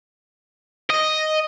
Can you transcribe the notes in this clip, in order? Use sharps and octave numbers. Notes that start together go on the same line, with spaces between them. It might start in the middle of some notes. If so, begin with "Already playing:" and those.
D#5